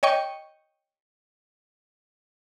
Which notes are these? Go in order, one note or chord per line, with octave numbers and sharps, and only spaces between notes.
C#5 D#5 G5 C#6